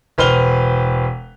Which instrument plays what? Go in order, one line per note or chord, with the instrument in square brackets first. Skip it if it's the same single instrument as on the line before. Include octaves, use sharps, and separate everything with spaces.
[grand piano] E1 B4 C5 F6 F7 G7